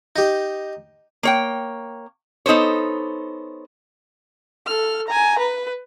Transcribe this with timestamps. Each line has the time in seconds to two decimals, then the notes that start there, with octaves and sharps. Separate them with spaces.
0.16 D#4 G4
1.23 A#3 C#5 G5
2.46 B3 D#4 A4 C5 C#5
4.66 A4 F6
5.08 G#5 A#5
5.39 B4